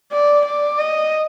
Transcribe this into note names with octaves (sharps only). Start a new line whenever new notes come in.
D5
D5
D#5